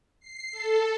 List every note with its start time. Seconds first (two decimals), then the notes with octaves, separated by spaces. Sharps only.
0.20 C7
0.52 A4